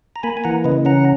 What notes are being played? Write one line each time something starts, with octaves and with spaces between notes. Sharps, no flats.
A#5
A#3 G#5 B5
G#5
E3 F#5 A#5
C#3 B4 D#5
C#4 F#5 A#5